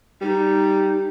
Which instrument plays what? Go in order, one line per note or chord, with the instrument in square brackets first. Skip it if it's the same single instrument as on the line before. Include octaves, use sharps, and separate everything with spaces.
[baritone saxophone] G3 [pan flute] D#4